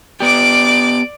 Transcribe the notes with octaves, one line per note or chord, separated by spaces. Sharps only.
B3 G4 D5 D6